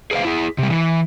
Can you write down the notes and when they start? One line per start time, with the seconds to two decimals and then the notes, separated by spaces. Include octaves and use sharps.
0.11 G#4 B4 C5 F5
0.25 E4 G#4
0.58 C3 G3
0.70 E3